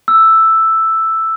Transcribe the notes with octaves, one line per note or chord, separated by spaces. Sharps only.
E6